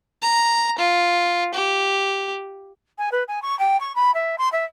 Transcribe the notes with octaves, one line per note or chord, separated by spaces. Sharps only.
A#5
F4
G4
G#5
B4
G#5
C#6
G5
C#6
B5
E5
C6
E5